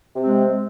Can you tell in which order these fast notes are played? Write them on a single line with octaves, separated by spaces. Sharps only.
C3 C4 G#3